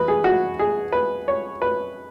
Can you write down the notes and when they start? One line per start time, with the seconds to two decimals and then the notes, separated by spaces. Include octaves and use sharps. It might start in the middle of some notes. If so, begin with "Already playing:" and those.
Already playing: E2 B4
0.08 G#4
0.24 F#4
0.59 G#4
0.92 B4
1.28 C#5
1.62 B4